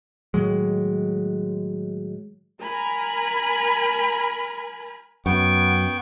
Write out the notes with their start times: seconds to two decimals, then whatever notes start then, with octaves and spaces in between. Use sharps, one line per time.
0.34 A2 D#3 F#3 G#3
2.62 A#4 G#5 A#5 B5
5.26 F#2 B3 G5 C#6